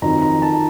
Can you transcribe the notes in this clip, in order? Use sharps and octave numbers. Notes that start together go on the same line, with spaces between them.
F2 D#3 F#3 C4 D#4 A#5
A#5
A5